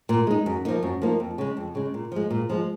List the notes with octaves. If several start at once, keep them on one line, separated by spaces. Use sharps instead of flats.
A#2
G#3 D#4
F#2
F3 A#3 D#4
F#2
F3 A#3 D#4
F2
C#3 G#3
F2
C#3 G#3
A#2
F3 G#3
A#2
F3 G#3